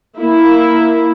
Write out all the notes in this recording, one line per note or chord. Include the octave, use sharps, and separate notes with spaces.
A#3 E4